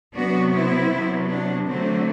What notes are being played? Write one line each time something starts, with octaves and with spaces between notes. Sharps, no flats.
C3 F#3 B3 D4 F#4
C4 E4
C3 F#3 B3
B3 D4
D3 F#3 A3 C4